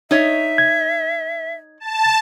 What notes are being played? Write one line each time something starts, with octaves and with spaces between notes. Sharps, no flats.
D#4 C#5 E5
G#6
A5